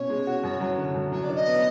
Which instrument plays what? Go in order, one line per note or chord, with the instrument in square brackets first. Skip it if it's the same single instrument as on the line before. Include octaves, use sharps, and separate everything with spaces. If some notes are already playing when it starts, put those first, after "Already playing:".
Already playing: [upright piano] B2 C#4 [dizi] C#5
[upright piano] G#3
F#4
F#2
F#3
D3
F#2
[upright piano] F#3 [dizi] C#5
[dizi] D5
[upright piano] D4
[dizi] D#5
[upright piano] B3